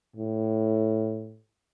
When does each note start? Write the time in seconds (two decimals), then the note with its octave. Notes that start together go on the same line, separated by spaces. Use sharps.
0.16 A2